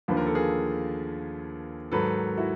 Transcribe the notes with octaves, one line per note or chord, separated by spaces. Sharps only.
D#2 D3 F3 B4
A#4
A4
G#4 A#4
G#2 D#3 F#3 A4 B4
E4 F#4